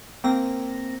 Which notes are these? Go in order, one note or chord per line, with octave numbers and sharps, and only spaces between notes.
A#3 C4 A#6